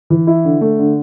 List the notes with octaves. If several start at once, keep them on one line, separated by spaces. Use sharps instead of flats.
E3
E4
D3
A3
D3